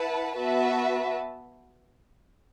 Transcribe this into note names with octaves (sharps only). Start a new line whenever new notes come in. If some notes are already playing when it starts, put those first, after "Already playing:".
Already playing: E4 B4 F#5 A5
B3 F#4 B4 E5 A5